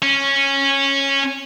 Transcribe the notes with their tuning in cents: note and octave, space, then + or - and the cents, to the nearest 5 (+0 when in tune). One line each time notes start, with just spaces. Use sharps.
C#4 -10